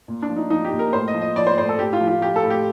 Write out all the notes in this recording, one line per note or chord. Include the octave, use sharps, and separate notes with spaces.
A#2
D4
F3
D#4
F3 D#4
G4
A#2
A#4
A2 C5
D#5
F3
D#5
F3 D5
C5
A2 C5
A4
A2 G4
F4
F3
F4
F3 G4
A4
A2
G4